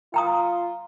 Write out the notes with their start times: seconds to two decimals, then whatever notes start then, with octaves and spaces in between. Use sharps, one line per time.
0.14 F4 G5 A#5 D#6